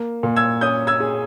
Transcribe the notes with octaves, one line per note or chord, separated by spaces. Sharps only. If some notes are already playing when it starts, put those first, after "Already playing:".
Already playing: A#3
A#2
E6 G#6
C#4 D#6 G6
E6 G#6
G#4